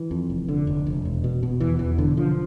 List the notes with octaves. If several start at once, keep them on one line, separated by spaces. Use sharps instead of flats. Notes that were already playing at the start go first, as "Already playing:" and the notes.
Already playing: E3
F2
F1
D3
F1
F1
E1
B2
B2
E2 E3
E2 E3
E1 D3
D3 F3